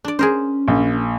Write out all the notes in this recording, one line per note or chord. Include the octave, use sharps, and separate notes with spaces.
D4 D5
C#4 G#4 A#4 C5
A#1